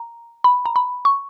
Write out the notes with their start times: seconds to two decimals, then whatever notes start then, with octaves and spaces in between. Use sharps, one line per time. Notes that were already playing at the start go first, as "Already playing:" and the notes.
Already playing: A#5
0.44 B5
0.66 A#5
0.76 B5
1.05 C#6